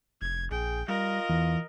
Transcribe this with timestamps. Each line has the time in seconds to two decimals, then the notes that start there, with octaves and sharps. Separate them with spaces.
0.22 F1 G#6
0.51 A#1 G#4 G5
0.88 G3 F4 A#4 D#5
1.30 E2 E3